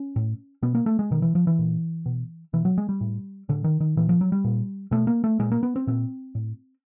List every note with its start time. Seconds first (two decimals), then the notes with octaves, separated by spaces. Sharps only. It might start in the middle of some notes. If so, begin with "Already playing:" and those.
Already playing: C#4
0.16 A2
0.62 B2 B3
0.75 A#3
0.86 A3
0.99 G#3
1.11 B2 D#3
1.22 E3
1.35 F3
1.47 E3
1.59 A#2
2.06 B2
2.53 B2 E3
2.65 F#3
2.78 G#3
2.89 G3
3.01 A2
3.49 A2 D3
3.64 D#3
3.80 D#3
3.97 A#2 E3
4.09 F3
4.21 F#3
4.32 G3
4.44 A#2
4.91 B2 A3
5.07 A#3
5.24 A3
5.39 A#2 G#3
5.52 A#3
5.63 B3
5.76 C4
5.87 A#2 C4
6.35 A2